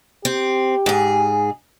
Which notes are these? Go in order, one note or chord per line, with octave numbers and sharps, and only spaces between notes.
C4 G4
G#2 G#4